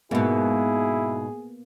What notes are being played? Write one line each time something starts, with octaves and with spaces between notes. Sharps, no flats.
G#2 B2 A#3 B3 E4 G#4